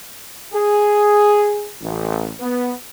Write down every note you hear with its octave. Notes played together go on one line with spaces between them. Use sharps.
G#4
A1
B3